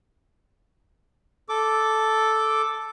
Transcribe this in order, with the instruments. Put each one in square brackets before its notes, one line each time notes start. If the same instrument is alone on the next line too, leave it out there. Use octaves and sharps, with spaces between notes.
[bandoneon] A4 D6